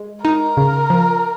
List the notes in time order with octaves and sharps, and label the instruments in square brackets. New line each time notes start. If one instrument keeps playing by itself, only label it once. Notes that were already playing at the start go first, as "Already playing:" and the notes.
Already playing: [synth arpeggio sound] G#3
[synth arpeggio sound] D#4 [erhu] A#4
[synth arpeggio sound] C#3
F3